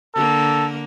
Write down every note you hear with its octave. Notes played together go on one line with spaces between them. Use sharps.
D3 A#3 A4